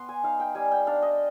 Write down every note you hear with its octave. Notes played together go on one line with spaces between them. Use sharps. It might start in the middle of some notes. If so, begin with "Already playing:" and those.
Already playing: B3 C6
G#5
D#4 F5
G5
G3 G#5
G5
D4 F5
D#5